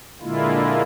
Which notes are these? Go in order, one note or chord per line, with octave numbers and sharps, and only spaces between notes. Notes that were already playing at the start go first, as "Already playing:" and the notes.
A#2 D3 G#3 A#3 E4 F4